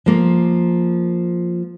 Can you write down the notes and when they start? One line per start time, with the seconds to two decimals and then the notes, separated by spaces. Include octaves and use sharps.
0.06 F3 A#3